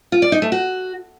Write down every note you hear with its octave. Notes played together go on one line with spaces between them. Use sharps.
F4
D5
D#4
A3
F#4